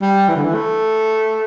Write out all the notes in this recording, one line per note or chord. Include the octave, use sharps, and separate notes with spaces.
G3
E3
D3
E3
A3